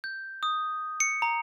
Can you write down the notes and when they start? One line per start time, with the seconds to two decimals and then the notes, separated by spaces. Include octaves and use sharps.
0.04 G6
0.43 D#6
1.00 C#7
1.22 A#5